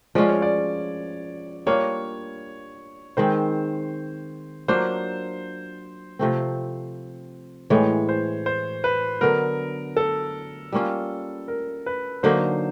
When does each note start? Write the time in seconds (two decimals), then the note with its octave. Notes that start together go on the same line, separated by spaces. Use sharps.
0.15 F3 G#3 C#4 F4 D5
0.28 C#5
0.42 D5
1.66 G3 A#3 D4 F4 C#5
3.17 D#3 G#3 C4 C5
4.68 F#3 A#3 D4 F4 C5
6.19 C3 F3 A3 C4
7.70 A2 E3 G#3 C#5
8.09 C5
8.46 C5
8.84 B4
9.21 D3 F#3 B3 A#4
9.97 A4
10.73 G3 A#3 C#4 F4
11.48 A#4
11.86 B4
12.23 D3 F#3 A#3 D#4 C5